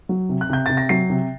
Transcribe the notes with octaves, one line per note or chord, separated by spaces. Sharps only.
F#3
C3
F#6
C3 G6
C3 A6
A#6
F#3 C7
C3